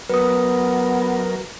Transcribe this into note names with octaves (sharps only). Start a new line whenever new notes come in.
F#3 B3 A#4 B4 D#6